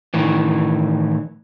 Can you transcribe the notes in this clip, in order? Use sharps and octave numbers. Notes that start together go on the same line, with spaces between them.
A2 D#3 E3